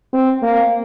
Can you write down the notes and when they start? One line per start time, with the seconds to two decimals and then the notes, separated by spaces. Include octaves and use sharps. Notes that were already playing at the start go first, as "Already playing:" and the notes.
0.13 C4
0.43 A#3